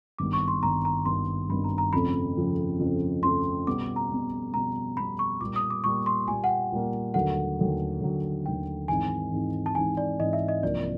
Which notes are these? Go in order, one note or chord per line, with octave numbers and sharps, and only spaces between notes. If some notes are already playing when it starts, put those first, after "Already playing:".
G#1 G2 D#3 G3 B3 D6
C#6
C6
G#1 G2 D#3 G3 B3 A#5
A#5
G#1 G2 D#3 G3 B3 C6
G#1 G2 D#3 G3 B3 B5
A#5
A#5
F2 C#3 F3 A3 C4 B5
F2 C#3 F3 A3 C4
F2 C#3 F3 A3 C4
F2 C#3 F3 A3 C4 C6
B2 G3 B3 D6
A#5
B2 G3 B3
B2 G3 B3 A#5
B2 G3 B3 B5
C#6
A#2 G3 A#3 D6
D#6
D6
A#2 G3 A#3 C#6
C6
A#2 G3 A#3 G#5
F#5
G5
A#2 G3 A#3
D#2 D3 F#3 A3 F#5
D#2 D3 F#3 A3
D#2 D3 F#3 A3
D#2 D3 F#3 A3 G5
G#2 E3 G#3 C4 D#4 G#5
G#2 E3 G#3 C4 D#4
A5
G#2 E3 G#3 C4 D#4 G#5
D5
G#2 E3 G#3 C4 D#4 D#5
E5
D#5
C2 C3 F3 A#3 D4 D5